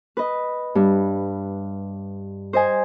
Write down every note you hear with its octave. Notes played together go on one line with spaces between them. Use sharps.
B4 D#5
G2
C5 D#5 G#5